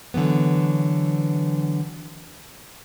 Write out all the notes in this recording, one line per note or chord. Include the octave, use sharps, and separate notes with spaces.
D3 E3 F#3 B3